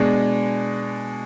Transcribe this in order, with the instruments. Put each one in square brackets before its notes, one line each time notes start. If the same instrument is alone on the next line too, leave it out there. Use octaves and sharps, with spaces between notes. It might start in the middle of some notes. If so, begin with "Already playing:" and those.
Already playing: [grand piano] B2 G#3 D4